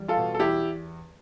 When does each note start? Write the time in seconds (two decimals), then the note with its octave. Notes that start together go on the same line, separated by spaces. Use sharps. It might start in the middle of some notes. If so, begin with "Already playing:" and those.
Already playing: E2 G3
0.08 F4 A4
0.17 B2
0.34 A4
0.39 E2 E4 G4